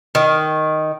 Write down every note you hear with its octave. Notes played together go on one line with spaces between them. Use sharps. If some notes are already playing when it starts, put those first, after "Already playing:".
D#3